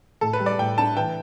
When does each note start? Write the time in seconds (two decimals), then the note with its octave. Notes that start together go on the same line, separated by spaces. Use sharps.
0.21 A2 A4
0.33 B4
0.40 G3
0.46 D5
0.59 A2 G5
0.78 D4 A5
0.96 E3 G5